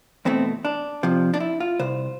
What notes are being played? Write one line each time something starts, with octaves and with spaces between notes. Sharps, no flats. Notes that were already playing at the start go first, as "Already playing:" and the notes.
E2 B2 A3 C4
D4
F2 C3 F3
D4
E4
F4
C2 C3 C5